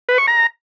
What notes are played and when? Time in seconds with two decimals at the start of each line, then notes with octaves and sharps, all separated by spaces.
0.09 B4
0.18 C#6
0.27 A#5